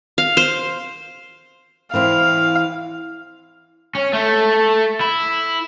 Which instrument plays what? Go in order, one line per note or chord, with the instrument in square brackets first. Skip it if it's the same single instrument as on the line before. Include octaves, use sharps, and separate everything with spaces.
[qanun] F5
C5
[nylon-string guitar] E3 C4 E4 [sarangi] F5
[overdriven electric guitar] C#4
A3
E4